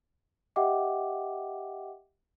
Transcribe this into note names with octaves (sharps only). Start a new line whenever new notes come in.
G4 D#5 E5 F#5 G5 D6